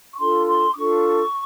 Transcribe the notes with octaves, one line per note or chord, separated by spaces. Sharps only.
C#6
D4 F4 A4 C6
C6
D6
D4 F4 A4 C#6